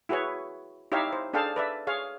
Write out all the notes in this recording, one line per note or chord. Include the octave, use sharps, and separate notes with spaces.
E4 F#4 G#4 B4 C#5
D#4 E4 G4 C#5 E5 F5
C5
D4 G#4 A4 F5 G5 A5
B4 D5 E5
G#4 C#5 F5